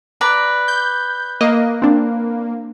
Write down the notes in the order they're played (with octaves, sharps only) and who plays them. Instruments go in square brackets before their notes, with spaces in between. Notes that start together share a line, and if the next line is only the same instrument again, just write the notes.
[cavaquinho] B4 D5 A#5
[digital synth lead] G6
[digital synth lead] A#3 [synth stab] D#5
[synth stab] C4 D4